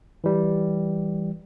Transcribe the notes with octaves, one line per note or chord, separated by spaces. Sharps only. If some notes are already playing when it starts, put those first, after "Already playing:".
E3 G3